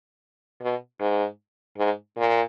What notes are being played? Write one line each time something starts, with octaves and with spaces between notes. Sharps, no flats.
B2
G#2
G#2
A#2